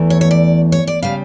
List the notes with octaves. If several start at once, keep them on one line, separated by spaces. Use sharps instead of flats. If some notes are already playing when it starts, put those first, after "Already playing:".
Already playing: E2 E3 A3
C#5
C#5
D5
C#5
D5
C#3 G3 F5